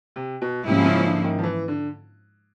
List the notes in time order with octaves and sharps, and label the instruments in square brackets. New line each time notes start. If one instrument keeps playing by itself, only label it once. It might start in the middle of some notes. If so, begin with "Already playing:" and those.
[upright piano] C3
B2
[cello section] G#2 F3 A#3 C#4 E4 [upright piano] C3
[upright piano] C#3
D3
D#3
F3
E3
D3